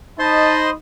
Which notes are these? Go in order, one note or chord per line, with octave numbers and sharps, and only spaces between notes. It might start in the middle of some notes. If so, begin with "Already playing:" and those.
D#4 C5 D#5 A5 B5 C6